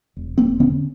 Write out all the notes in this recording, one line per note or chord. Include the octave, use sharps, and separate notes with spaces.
E1
E1 A#3 C4
D3 B3 C#4